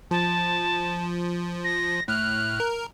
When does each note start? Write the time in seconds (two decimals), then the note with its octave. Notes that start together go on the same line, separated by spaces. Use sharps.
0.11 F3 A5
1.64 A#6
2.08 A2 F6 F#6
2.60 A#4